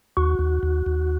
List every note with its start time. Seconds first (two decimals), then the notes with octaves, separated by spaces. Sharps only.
0.17 D#2 F#4
0.39 D#2
0.63 D#2
0.86 D#2